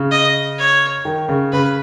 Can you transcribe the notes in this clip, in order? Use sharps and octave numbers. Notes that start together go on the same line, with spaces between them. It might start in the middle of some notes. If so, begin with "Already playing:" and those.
Already playing: C#3
D#5
C#5
D#3
C#3
C#3 B4